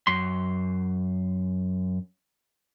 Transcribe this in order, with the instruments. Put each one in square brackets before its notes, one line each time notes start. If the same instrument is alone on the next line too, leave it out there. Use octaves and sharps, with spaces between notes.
[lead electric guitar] F#2 C6